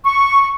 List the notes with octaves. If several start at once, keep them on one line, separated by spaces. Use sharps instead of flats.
C#6